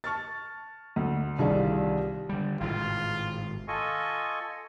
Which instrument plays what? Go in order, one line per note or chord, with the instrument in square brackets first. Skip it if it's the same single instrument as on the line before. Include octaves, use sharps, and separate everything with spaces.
[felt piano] A5 C#6 F6 A6
D2
C2 D#3 G3 F4 G#4 D5
[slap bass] D3 G3
[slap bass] G#1 A2 C3 [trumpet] F4
[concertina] F4 A4 D#5 G#5 C#6